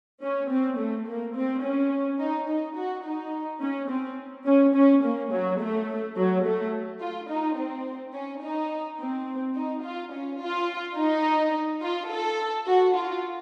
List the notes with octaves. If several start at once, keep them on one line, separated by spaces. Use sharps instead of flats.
C#4
C4
A3
A#3
C4
C#4
D#4
D#4
F#4
D#4
C#4
C4
C#4
C#4
A#3
F#3
A3
F#3
A3
F4
D#4
C4
C#4
D#4
C4
D#4
F4
C#4
F4
D#4
F4
A4
F#4
F4